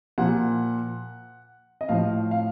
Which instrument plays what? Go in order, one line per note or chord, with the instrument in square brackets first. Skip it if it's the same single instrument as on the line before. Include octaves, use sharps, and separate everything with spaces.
[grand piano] A#2 F3 F#5
D#5
A2 F3 F5
F5